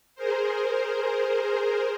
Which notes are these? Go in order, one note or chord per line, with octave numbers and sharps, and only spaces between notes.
G#4 A#4 C5